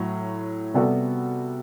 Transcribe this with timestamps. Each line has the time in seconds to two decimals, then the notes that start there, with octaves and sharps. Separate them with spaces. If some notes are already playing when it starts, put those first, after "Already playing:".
Already playing: A2 F#3
0.74 C3 G3 B3 F#4 A4